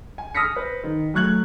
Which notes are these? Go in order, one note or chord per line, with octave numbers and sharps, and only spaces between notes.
G#5
D#6 F6 A#6 B6 C#7
B4 C5
D#3
F#3 A3 C#6 F#6 G#6 F#7